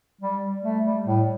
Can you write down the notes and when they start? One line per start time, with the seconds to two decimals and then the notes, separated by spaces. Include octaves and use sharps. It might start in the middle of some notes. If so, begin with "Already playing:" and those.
0.21 G3
0.63 A3
0.84 G3
1.06 A2